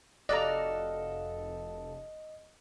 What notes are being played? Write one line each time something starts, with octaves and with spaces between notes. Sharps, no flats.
F1 F#4 A4 D5 D#5 F5 A#5